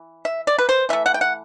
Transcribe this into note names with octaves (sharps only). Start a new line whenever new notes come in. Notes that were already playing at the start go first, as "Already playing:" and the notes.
Already playing: E3
E5
D5
B4
C5
E3 A3 E5
F#5
G5
F#5